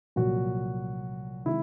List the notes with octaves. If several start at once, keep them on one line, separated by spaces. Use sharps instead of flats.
C2 A#2 F3 F#3 F#4
C3 D#3 G#3 C4 E4